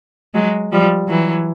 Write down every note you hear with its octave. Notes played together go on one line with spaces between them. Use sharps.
F#3 G#3
F3 G3
E3 F#3